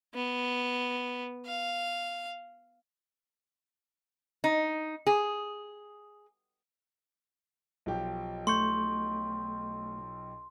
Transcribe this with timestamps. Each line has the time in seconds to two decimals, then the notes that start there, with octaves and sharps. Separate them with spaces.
0.15 B3
1.46 F5
4.44 D#4
5.07 G#4
7.86 B1 F3 G4
8.47 A3 C6 C#6 G6